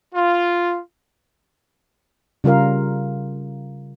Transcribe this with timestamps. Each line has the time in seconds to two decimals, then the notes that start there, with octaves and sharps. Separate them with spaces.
0.15 F4
2.44 C#3 G3 F4 A#4 F5